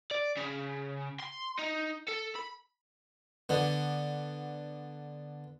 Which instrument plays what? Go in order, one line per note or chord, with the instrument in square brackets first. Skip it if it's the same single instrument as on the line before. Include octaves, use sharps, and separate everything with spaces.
[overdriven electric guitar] D5
C#3
C6
D#4
A4
B5
[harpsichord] D3 B3